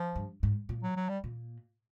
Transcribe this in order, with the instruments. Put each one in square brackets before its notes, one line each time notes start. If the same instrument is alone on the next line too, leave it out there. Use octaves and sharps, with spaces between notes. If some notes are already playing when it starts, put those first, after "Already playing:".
Already playing: [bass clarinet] F3
[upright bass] G2
G#2
A#2
[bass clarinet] F#3
F#3
G3
[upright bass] A#2